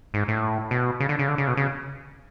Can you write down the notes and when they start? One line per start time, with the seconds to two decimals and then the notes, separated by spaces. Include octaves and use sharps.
0.14 G#2
0.28 A2
0.71 B2
1.00 C#3
1.09 D3
1.19 C#3
1.28 D3
1.38 C#3
1.47 B2
1.57 C#3